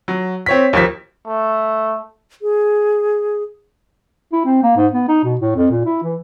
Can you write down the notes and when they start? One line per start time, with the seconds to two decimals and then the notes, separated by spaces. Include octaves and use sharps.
0.08 F#3
0.46 C4 C#5 B6
0.73 D#2 F3 B6
1.26 A3
2.42 G#4
4.33 E4
4.45 C4
4.63 A#3
4.77 G#2
4.93 B3
5.08 D#4
5.24 B2
5.41 A2
5.56 F2
5.71 A#2
5.85 E4
6.03 E3